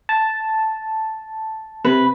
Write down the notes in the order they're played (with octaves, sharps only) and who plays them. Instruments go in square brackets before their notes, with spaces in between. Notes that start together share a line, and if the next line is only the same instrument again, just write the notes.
[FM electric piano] A5
[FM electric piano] C3 [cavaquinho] B4